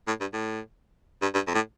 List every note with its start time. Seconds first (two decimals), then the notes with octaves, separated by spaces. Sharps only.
0.08 A2
0.21 G2
0.33 A2
1.22 G2
1.35 G2
1.48 F2
1.54 A2